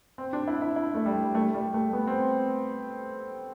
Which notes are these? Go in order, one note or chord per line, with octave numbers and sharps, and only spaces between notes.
C4
D4
E4
E4
E4
A3
G3
A3
G3
A3
B3
C4